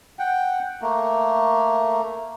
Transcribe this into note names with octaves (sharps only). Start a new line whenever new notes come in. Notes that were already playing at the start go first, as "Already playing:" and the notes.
F#5 G5
A3 A#3